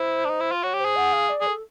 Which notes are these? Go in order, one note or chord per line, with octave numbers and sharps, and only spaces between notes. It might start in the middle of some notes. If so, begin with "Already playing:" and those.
Already playing: E4 C5
D4
D#4
E4
F4
F#4 C#5
G4
C5
G#4
F#5
F5
D5
G#4
A4